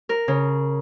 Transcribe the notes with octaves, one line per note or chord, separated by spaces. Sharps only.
A#4
C#3